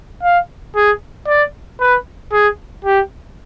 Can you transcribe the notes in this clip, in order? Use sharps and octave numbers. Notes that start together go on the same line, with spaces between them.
F5
G#4
D5
B4
G#4
G4